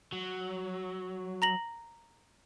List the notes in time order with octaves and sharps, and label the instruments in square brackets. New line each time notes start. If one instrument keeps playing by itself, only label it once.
[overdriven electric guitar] F#3
[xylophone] A#5 A#6 F#7